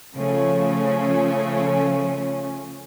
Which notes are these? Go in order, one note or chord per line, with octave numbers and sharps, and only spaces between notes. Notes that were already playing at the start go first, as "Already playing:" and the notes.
C#3 F3 A3 C#4